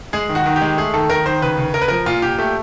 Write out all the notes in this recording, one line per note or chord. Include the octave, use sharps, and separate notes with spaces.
G#3 G#4
D#3
F#4
D#3
G4
G#3
A3 G#4
D#3 A4
D#3 A#4
D#3 C5
C#3 B4
C#3
C#3 A#4
B4
F3 A#4
A#2 F4
A#2 G4
A3 G4